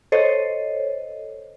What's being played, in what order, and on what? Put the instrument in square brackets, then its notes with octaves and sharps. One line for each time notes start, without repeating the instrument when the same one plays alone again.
[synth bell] A4 C5 C#5 D#5